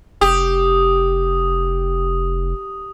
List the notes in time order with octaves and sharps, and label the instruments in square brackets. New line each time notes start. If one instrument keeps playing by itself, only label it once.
[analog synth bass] F1 [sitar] G4 [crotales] D#6